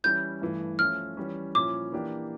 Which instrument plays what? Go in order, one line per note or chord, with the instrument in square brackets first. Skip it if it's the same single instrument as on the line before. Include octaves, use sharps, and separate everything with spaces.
[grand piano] E3 G3 C#4 E4 [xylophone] G6
[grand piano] G2 E3 A3
[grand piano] F3 A3 C#4 F4 [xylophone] F6
[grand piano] E3 G3 C#4
[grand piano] A#2 F3 C#4 E4 [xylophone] D6
[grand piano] E3 A#3 D4 G4